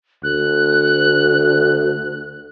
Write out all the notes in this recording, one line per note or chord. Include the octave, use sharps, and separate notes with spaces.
D2 F#6